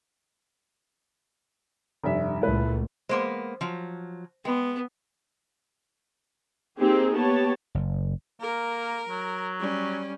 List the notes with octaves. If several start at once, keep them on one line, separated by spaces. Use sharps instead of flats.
F1 G2 E5
C#2 A#2 A3 E4 B4
G#3 A#3 B3 C5 C6 D6
F3 F#3
G#3 B3 G5 B5
A#3 C4 D#4 G4 G#4
B3 G4 C#5 A5
F#1
A#3 A#4
F#3
G3 C#4